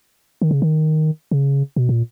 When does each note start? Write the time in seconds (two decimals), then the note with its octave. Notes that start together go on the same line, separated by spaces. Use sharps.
0.42 D#3
0.51 C#3
0.62 D#3
1.31 C#3
1.76 B2
1.89 A#2